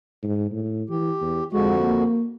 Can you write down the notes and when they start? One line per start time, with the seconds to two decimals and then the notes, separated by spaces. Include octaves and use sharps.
0.23 G#2
0.52 A2
0.89 E3 G4
1.22 E2
1.53 F2 D3 G#3 F#4
1.81 A#3